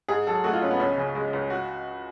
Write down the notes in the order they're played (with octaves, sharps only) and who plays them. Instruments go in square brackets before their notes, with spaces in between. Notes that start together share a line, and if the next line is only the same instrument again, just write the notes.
[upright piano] G#2 G#4
F#3 A4
A3 F#4
F4
G#2 C#4
B3
C#2 C#4
C#3
G#3
C#2
F#4